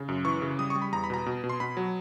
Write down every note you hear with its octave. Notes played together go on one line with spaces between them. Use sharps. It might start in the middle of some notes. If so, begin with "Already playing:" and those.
Already playing: C#3
F#2
E3 C#6
C#3
G3 D#6
C#6
G3
B5
E2 A#5
B5
B2 A#5
B2
B2
C6
B2 B5
F#3